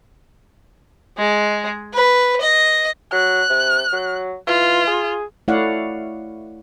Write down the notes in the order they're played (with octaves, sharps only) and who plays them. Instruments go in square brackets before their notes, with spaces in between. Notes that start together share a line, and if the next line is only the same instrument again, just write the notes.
[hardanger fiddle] G#3
B4
D#5
[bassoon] F#3 [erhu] F#6
[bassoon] C3
F#3
[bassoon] E3 [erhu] F4
[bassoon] G#4
[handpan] A3 E4 C#5 D5 F5 F#5